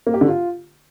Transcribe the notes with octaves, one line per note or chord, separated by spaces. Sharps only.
A#3
G4
D3
F4